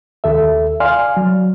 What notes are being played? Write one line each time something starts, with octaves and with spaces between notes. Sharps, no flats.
D#2 A4 E5
D5 F5 G#5 C6 F6
F#3